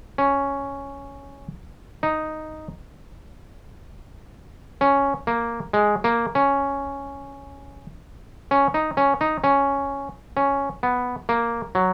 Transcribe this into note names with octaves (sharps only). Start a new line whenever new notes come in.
C#4
D#4
C#4
A#3
G#3
A#3
C#4
C#4
D#4
C#4
D#4
C#4
C#4
B3
A#3
F#3